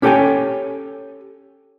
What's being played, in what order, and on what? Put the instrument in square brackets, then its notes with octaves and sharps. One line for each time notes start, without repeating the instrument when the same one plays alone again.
[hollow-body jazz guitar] C#4 G4 A4 C#5 G5 G#5